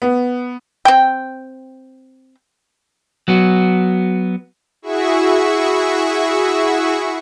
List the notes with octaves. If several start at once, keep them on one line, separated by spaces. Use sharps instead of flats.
B3
C4 G5
F#3 B3 F#4
E4 F#4 G#4 E5 C#6